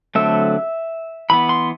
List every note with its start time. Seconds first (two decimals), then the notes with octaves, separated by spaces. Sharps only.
0.15 D3 F#3 A3 C4 E5
1.30 E3 B3 B5
1.49 C6